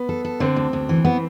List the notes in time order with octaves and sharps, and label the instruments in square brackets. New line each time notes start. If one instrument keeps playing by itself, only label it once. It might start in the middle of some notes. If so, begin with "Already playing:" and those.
Already playing: [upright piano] B3
[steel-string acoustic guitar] A4
A4
[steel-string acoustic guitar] D3 [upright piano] C4
[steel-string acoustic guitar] D2
D2
E3
B3